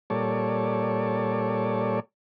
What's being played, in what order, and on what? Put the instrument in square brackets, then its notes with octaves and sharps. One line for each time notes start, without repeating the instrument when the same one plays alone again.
[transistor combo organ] A#2 G3 A4 C#5 D5